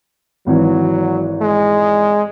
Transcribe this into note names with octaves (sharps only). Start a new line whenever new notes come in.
G#1 E3 F#3
G#3